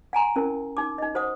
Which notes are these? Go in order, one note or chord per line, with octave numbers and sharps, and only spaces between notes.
F#5 G#5 A#5 C6
C#4 E4 A#4
D#4 D6
D#4 D#5
F#4 C5 F#5 D#6